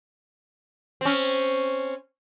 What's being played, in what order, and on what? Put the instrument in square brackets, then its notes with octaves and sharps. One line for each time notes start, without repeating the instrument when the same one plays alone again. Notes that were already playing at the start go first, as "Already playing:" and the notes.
[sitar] C4 C#4